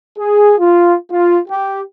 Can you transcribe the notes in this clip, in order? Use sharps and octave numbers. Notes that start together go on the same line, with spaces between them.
G#4
F4
F4
G4